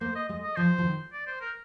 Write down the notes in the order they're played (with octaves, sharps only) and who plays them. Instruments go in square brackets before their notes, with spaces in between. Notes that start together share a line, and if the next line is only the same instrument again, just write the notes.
[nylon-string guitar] A#3 [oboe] C5
[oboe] D#5
[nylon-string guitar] G#3 [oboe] D#5
[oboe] D#5
[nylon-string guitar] F3 [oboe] C5
[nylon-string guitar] F3
D#3
[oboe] D5
C5
A#4